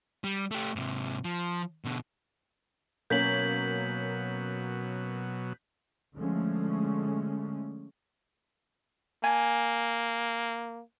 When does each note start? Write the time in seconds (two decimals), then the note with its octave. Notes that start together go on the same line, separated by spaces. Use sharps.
0.24 G3
0.51 A3 G4
0.76 G#2 C3
1.25 F3
1.85 B2 D3
3.10 B2 F#3 A#3 C#4 G6 B6 F#7
6.17 D3 F3 G#3 A3 C#4
9.24 A#3 G#5